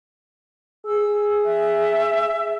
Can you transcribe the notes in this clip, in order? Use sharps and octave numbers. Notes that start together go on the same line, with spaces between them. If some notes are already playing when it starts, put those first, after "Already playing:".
G#4 E6
E5